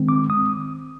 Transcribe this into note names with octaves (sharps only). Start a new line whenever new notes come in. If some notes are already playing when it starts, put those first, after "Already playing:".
Already playing: D#3 G#3 C4
D6
D#6